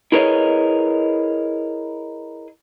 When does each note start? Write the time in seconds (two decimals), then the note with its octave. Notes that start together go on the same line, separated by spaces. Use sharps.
0.12 E4 G#4 A#4 B4 C#5 D#5